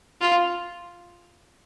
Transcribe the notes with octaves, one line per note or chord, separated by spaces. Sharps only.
F4